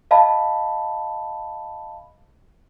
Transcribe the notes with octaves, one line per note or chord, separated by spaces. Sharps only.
D#5 F5 A5 B5